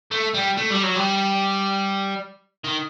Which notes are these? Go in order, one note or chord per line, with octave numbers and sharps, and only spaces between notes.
A3
G3
A3
G3
F#3
G3
D#3